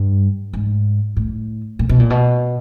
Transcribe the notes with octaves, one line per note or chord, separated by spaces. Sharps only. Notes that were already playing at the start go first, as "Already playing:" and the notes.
Already playing: G2
G#2
A2
A#2
B2
A#2
B2